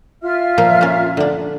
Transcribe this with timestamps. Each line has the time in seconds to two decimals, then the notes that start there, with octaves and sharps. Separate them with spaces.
0.22 F4 E5 F6
0.58 A#2 F3 A#3
0.81 A#3 C#4
1.17 D3 D4